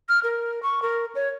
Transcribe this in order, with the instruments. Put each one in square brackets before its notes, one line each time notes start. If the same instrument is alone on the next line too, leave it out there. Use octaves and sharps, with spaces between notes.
[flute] F6
A#4
C#6
A#4
C#5